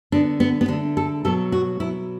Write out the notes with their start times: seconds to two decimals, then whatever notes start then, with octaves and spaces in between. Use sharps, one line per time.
0.12 D3 B3 D4
0.40 B3
0.61 B3
0.68 D3 D4
0.73 A3
0.97 A4
1.25 B2 F#3 B3 A4
1.52 F#4
1.80 B2 F#3 B3 E4